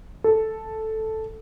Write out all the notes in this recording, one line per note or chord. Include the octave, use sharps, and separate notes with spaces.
A4